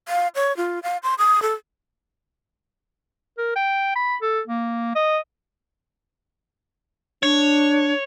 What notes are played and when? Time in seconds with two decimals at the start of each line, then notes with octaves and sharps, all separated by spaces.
0.08 F5
0.35 C#5
0.57 F4
0.83 F5
1.03 C6
1.18 D#6
1.42 A4
3.38 A#4
3.56 G5
3.95 B5
4.22 A4
4.48 A#3
4.95 D#5
7.23 D4 C#5